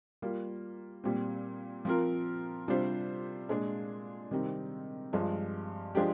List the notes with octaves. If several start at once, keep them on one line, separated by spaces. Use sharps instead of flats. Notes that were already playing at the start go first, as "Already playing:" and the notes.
G3 A#3 F4
A#2 G3 C4
F3 C4 F4 A#4
C3 G3 D4 F4 C5
A#2 G#3 D4
C3 D#3 G3 C4 D#4
G2 F3 G#3
F3 G#3 D4 G4